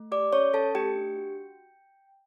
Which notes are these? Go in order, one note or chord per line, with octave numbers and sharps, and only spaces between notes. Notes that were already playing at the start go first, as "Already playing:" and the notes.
Already playing: A3
G4 D5 D6
C#4 C#5 C#6
C#4 A4 A5
A3 G4 G5
D4
F#4